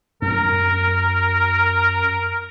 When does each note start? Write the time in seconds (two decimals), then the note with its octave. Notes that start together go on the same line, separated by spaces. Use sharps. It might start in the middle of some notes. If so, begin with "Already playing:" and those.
0.22 F#2 A#4